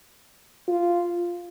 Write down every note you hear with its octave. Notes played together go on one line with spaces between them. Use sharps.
F4